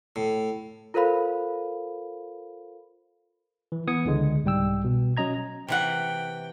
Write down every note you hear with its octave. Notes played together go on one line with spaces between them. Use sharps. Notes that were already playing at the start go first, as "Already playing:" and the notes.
A2
F4 A4 A#4 C5 F5 B5
E3
E3 B3 D#6 G#6 C#7
C#2 D3 G#3
C2 G#2 G3 G5 E6
B2
F#3 C#4 D#5 A#5 G#6
C3 E3 F#5 G5